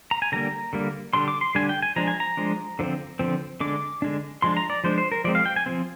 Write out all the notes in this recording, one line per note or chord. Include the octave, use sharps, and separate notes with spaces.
A#5
G#5
D3 G3 A#3 A#5
D3 G3 A#3
D3 G3 D4 C6
D6
C6
D3 G3 D4 G#5
G5
G#5
F3 G#3 D4 A#5
G#5
A#5
F3 G#3 D4
D3 F3 C4
D3 F3 C4
D3 G#3 D4 D6
D3 G#3 D4
F3 G#3 D4 C6
A#5
D5
F3 G#3 D4 C5
C5
A#4
F3 G#3 C4 D5
F5
G5
G#5
F3 G#3 C4